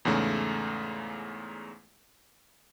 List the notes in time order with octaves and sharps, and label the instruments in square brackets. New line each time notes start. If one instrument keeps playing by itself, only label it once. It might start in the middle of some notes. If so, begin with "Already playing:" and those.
[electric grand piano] E2 G#2 C#3 A3